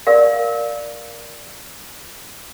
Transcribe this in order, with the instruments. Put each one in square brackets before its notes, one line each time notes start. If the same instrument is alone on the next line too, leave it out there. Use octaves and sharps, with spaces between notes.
[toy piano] A#4 D5 F5